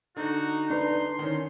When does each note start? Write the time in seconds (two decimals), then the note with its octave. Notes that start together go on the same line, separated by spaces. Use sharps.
0.16 D3 D#4 F#4
0.70 D4 B4 C6
1.19 D#3 C#4